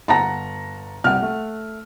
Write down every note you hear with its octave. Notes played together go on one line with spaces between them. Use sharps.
G1 F#5 A5 A#5 A#6
C2 F#5 F6
A3